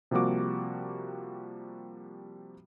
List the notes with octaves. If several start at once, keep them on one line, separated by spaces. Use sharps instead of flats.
C3 F3 G3 A#3 F#4 D6